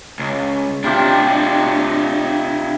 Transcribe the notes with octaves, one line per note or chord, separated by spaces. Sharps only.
C#2
C3 D4 E4 F4 G4